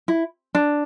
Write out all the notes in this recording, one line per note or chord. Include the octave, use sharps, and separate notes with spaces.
E4
D4